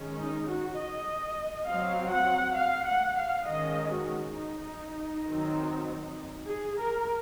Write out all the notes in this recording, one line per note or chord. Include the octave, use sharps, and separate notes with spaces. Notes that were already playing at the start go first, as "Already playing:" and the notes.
Already playing: D#3 G#3 C#4
D#4
F#4
D#5
F#3 C4 F5
F#5
F5
F#5
F5
D#3 G#3 C#4 D#5
F#4
D#4
D#3 F#3 C4
G#4
A#4